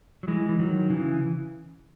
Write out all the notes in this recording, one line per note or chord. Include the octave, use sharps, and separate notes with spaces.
F#3
E3 G#3
E3
D#3 F#3
C#3 E3